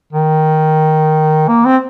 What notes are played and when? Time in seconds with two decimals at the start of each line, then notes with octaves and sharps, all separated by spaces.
0.13 D#3
1.48 A#3
1.65 C4